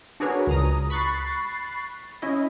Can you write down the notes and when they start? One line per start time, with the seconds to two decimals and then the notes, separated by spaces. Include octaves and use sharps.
0.20 D4 F#4 G#4 A#4 B4 C#5
0.47 C#2 A#5 D#6
0.90 B5 C#6 F#6 A6 C7
2.22 C#4 E4 D#5